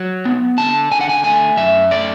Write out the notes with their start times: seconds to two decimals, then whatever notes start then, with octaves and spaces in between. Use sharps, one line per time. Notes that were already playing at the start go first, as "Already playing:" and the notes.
Already playing: F#3
0.25 B3
0.58 D3 A5
0.91 D3 G#5
1.01 F#5
1.09 G#5
1.24 A3 G#5
1.57 F#2 E5
1.91 A3 D5